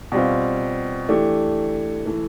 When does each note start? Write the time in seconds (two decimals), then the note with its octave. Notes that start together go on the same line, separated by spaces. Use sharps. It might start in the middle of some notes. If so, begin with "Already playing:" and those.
0.12 B2 G3 C4 F4
1.09 E3 A3 D4 G4
2.06 E3 A3